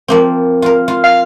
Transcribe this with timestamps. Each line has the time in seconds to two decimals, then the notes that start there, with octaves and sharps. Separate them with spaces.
0.08 F3 A#3 C4
0.62 F4 A#4
0.88 F4
1.04 F5